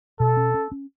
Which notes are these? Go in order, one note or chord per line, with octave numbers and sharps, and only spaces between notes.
B2 A4
C#4
C#4
C#4